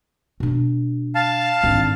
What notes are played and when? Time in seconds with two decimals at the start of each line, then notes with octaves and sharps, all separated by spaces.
0.40 B2 D4
1.15 F5 A5
1.63 G#1 D3